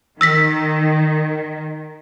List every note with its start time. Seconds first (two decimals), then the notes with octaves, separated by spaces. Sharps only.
0.21 D#3 E6 A#6 B6